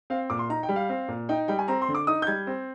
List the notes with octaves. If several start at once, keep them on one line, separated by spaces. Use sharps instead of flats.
C4 F5
A#2 D6
C6
D#4 A#5
G5
G3
F5
C4
A#2
D#4 G5
G3 G5
G#5
C4 A#5
C6
D3
D6
D#4 D#6
G6
G3 G#6
C4